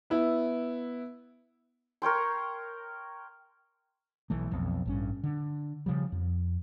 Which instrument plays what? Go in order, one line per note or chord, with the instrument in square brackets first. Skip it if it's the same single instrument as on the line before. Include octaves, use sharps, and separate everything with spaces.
[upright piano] B3 E4
[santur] A#4 C#5 G5 C6
[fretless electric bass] B1 E3 A3
B1 F2
A1 G2 C#4
D3
C#3 F3 G3
F2